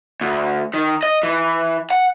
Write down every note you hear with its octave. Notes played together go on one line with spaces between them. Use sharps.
D2
D#3
D#5
E3
F#5